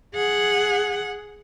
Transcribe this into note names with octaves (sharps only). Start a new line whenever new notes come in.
G#4 F#5